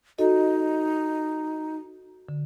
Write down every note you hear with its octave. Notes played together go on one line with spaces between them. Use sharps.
D#4 F#4 A4 D#5
D3